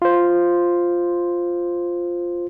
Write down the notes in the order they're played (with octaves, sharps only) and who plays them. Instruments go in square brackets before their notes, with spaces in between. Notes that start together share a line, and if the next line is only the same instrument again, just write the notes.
[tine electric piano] F4 C5